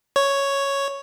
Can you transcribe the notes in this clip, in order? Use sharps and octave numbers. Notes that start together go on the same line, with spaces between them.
C#5